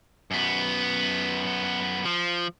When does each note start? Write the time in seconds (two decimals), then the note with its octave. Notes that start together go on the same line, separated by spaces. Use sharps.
0.31 F#2 B3
2.05 F3